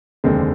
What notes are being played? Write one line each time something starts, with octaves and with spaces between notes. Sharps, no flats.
F1 D#2 D3 G#3 C4